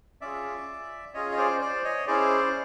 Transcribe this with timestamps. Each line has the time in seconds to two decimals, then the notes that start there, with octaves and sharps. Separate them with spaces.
0.21 C#4 F4 G#4 D5 E5
1.14 C#4 F4 G#4 C#5 D#5
1.32 D#5
1.37 C5 D5
1.61 C5 D5
1.84 C#5 D#5
2.07 C#4 E4 G#4 C5 D5